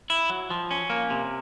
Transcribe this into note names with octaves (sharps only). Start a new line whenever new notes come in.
E4
F#3
F3
C#4
A#3
C3